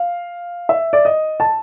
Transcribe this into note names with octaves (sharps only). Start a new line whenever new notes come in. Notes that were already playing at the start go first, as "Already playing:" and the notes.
Already playing: F5
E5
D5
D#5
A5